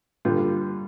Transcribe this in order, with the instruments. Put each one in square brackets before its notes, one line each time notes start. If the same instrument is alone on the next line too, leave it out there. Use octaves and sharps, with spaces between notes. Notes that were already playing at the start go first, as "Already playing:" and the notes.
[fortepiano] G2 D3 G3 F4